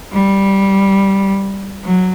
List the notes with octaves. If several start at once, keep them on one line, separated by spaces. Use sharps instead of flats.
G3
F#3